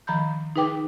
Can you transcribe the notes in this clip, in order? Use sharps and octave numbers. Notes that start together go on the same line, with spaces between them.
D#3 F3 A#5 B5 G6
D#4 G#4 B4 G5 D6